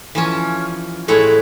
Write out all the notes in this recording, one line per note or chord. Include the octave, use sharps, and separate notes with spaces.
E3 F3 C#4
A2 G#3 A3 E4 C#5 F#5